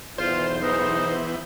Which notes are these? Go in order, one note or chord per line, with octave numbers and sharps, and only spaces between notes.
B1 E2 F4 C5
E3 B3 D#4